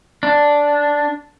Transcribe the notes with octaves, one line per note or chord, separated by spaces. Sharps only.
D4